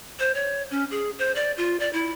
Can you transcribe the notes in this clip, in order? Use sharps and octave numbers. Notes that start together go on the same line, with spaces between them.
C5
C#5
C#4
G#4
C5
D5
F4
D5
E4